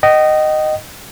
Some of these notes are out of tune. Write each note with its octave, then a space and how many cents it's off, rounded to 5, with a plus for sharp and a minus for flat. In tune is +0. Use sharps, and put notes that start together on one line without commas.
D#5 -10 G5 -45